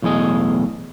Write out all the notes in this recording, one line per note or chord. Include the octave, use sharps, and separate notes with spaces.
B1 E2 A2 G#4 D#5